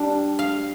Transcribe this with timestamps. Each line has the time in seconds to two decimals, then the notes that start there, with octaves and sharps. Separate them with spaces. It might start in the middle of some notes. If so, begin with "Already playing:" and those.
Already playing: G3 D4
0.39 F5